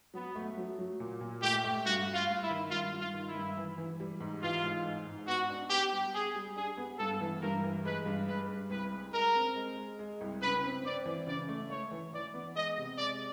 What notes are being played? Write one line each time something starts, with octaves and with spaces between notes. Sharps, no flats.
F#3 B3
A3
F#3
F#3
A#2
A#2
A3 G4
A3
G2 F#4
G2
F4
G2
E4
D#3
G2 F4
G2
F4
D#3
E4
G2
E3
E3
G3
G#2
E3 F4
G#2
G#2
G#2
B3 F#4
D4
B3 G4
G3
G4 G#4
G3
D4 G#4
B3
G2 A4
E3
G2 A#4
E3
G#3 B4
G2
G#3 B4
G2
C2 B4
G#3
G#3 A#4
C4
G#3
G#3
G#3
C2
C#3 B4
C4
C4 D5
E3
C#3 D5
A3
A3 C#5
E3
E3 D5
B3
G#3 D#5
C3
G#3 D5